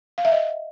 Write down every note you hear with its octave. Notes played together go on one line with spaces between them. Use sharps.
F5
E5
D#5